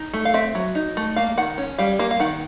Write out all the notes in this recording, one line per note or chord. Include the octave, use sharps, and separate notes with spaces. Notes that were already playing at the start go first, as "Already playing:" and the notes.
Already playing: D#4
A3
F5
C4 E5
F#3
D#4
A3
A#3 F5
D#3 F#5
C#4
G3 F5
A#3 F5
F5
D#3 F#5